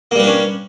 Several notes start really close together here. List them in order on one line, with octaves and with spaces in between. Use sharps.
A#3 G3 B4 D4 C#4